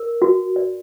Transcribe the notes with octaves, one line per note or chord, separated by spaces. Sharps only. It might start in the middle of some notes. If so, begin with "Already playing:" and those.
Already playing: A#4
F#4
D5